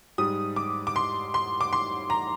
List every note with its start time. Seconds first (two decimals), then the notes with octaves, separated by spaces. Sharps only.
0.18 G#2 G3 D#6
0.56 D6
0.87 D6
0.96 C6
1.34 C6
1.61 D6
1.73 C6
2.10 A#5